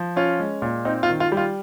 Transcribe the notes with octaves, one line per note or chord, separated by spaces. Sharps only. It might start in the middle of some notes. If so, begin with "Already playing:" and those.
Already playing: F3
C#4 F4
G#3
A#2
C4 D#4
F4
D#3
F4
G3
F4